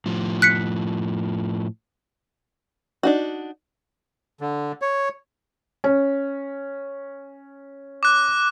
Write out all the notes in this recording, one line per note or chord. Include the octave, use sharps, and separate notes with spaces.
A2 F3
F#6 B6 C#7
D4 D#4 F#4
D3
C#5
C#4
D6 F#6